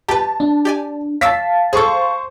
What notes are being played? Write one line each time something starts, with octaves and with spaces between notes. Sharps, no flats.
G4 B4 A5
D4
G4 D5 G#5
C#5 F5 A5 D6 E6 B6
G#4 A4 C5 C#6